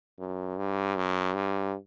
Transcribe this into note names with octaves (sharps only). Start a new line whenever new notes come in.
F#2
G2
F#2
G2